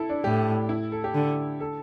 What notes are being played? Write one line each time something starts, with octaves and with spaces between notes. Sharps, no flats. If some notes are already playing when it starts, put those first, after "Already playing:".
Already playing: E4 A4
D4
A2 G4
E4
A4
G4
D3
A4